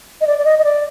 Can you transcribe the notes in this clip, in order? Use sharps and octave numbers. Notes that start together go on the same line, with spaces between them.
D#5
D5
D5
D#5
D#5
D5